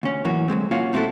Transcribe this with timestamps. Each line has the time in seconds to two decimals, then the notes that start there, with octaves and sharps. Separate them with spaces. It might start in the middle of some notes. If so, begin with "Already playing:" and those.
0.03 D2 C#4
0.25 A2 E3 F#3 A#3 F#4
0.48 D3 F#3 G#3 C4
0.71 A#3 C#4 F4 F#4 C#5 F5
0.93 A3 C4 D4 E4 F#4 A4